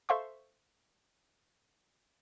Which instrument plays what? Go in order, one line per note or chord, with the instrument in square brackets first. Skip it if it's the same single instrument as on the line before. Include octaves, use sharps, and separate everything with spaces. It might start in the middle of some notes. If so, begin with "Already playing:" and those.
[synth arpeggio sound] A4 C5 E5 F5 C6 C#6